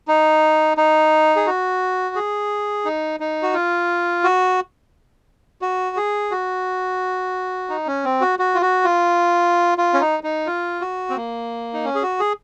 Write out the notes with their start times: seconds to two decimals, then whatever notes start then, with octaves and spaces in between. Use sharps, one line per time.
0.08 D#4
0.77 D#4
1.36 G#4
1.47 F#4
2.16 G#4
2.85 D#4
3.20 D#4
3.43 F#4
3.54 F4
4.24 F#4
5.62 F#4
5.97 G#4
6.31 F#4
7.69 D#4
7.87 C#4
8.05 C4
8.21 F#4
8.39 F#4
8.55 F4
8.62 F#4
8.85 F4
9.78 F4
9.94 C#4
10.01 D#4
10.23 D#4
10.47 F4
10.81 F#4
11.10 C4
11.17 A#3
11.74 D#4
11.85 C#4
11.95 G#4
12.03 F#4
12.20 G#4